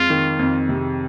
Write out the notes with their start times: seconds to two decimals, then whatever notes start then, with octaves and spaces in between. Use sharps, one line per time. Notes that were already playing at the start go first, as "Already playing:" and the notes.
Already playing: F2 G#3 F4
0.10 D#3
0.39 F2
0.69 C3